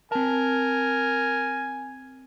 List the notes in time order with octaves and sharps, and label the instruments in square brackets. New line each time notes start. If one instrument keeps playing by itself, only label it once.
[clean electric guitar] C4 A5 [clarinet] A#4 [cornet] G#5